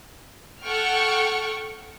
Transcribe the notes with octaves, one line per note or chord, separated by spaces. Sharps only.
A4 F#5 G5 C#6 F6